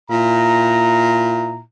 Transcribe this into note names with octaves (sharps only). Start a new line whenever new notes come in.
A#2 E4 A#5